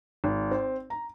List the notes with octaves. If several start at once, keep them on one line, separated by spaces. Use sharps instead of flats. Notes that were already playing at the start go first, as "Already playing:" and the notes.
G#1
C4
A#5